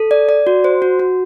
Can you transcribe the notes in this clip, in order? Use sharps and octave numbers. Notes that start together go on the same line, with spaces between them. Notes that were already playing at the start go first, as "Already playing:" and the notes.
Already playing: A4
D5
D5
F#4
C5
F#4
F#4